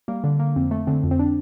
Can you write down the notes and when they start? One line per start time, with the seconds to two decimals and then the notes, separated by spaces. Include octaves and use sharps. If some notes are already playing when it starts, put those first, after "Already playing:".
0.08 G3 A#3
0.24 D3
0.40 A#3
0.56 F2 C4
0.71 A3
0.87 D3 C4
1.04 F2
1.11 C4
1.19 D4